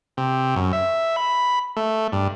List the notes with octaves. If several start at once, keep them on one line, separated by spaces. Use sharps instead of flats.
C3
F#2
E5
B5
A3
G2